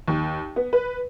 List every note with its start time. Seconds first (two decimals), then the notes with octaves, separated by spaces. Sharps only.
0.08 D#2
0.56 B3
0.73 B4